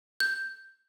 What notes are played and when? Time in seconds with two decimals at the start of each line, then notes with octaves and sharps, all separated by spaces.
0.20 G6